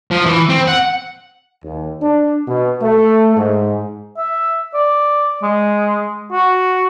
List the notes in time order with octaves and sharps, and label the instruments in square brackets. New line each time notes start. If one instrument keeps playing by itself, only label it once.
[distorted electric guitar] F3
E3
C4
F#5
[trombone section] D#2
D4
B2
A3
G#2
[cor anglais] E5
D5
G#3
F#4